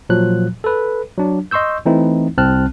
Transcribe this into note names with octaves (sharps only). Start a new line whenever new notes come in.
A#2 F3 F#3 F#6
A4 B4
F#3 D4
D#5 C6 C#6 E6 G6
E3 A3 C4 D#4 E4
C2 C4 A5 F6 F#6